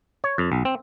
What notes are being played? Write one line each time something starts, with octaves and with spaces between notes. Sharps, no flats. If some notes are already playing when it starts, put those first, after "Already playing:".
C#5
F2
B1
C4